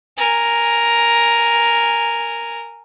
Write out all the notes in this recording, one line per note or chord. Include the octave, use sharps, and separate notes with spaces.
A#4 G#5